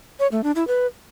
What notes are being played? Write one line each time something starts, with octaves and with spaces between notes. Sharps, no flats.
C#5
A3
D4
E4
B4